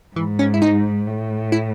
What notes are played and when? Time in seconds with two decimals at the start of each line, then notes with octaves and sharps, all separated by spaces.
0.16 G#2 E3
0.39 C#4
0.54 E4
0.62 D#4
1.07 A2
1.52 E4